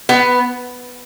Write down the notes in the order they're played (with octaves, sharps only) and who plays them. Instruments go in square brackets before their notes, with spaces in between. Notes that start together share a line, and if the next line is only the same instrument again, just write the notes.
[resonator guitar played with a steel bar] B3